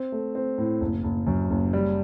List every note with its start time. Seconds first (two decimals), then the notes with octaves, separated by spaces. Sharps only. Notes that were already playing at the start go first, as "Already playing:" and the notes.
Already playing: C4
0.12 A3
0.35 C4
0.58 A2
0.81 F#1
1.04 F#1
1.27 F#2
1.50 F#1
1.73 G3